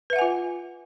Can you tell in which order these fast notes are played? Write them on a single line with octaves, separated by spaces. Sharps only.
B4 E5 F#5 G#5 F4